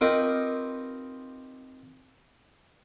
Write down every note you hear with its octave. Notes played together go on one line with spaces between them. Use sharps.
C4 D#4 F4 G4 A#4 B4